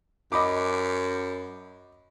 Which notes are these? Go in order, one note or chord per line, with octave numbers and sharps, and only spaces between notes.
F#2 D#5 B5 D6